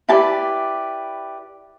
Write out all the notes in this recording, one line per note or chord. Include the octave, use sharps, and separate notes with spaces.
E4 G4 B4 D5 A5